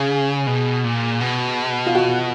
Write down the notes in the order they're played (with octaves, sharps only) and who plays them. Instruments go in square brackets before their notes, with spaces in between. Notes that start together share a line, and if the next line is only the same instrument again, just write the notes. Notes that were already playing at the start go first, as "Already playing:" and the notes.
Already playing: [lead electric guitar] C#3 [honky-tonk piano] G#4
[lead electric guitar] B2
A#2
B2
[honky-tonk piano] F4
F#4